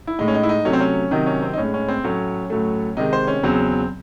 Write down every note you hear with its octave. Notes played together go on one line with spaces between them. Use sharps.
E4
A2 G#3 D#4
C#4
D#4
E4
D#4
C3 F#3 A3 C#4
C4
C#4
C3 D#3 F#3 D#4
C#4
C4
D#4
A2 G#3 C#4
C#4
C4
A2 F#3 A3 C#4
A2 F#3 A3
C3 D#3 G#3 D#4
C5
C#4
E2 C#3 F#3 C4